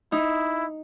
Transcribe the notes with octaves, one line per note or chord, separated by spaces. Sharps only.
D#4 E4